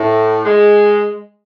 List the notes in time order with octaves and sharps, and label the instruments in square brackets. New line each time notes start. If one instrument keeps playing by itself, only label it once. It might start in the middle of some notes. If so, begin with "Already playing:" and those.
Already playing: [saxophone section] A2
G#3